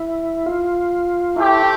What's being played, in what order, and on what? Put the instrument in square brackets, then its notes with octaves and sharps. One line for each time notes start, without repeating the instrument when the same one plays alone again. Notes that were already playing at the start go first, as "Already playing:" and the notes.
Already playing: [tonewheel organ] E4
F4
[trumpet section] A3 C4 G4 [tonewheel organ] E4